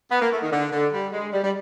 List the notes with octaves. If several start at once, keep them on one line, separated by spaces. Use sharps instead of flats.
B3
A#3
A3
D#3
D3
D3
G3
G#3
G3
G3